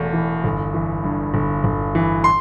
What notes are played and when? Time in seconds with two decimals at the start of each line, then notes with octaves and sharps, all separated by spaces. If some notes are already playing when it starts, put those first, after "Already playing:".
Already playing: E1 E2 A3
0.13 E3
0.44 G1
0.74 E3
1.04 G2
1.34 G1
1.64 G1
1.95 E3
2.24 C6